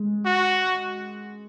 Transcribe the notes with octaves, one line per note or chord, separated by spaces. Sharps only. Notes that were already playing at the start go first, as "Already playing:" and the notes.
Already playing: G#3
F#4